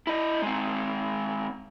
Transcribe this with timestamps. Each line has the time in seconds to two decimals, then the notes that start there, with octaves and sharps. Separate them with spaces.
0.07 E4 D#5
0.42 G#3 C4